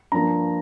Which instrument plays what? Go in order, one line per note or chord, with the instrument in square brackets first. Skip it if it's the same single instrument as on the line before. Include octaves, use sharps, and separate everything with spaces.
[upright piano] G2 F3 A#3 A#5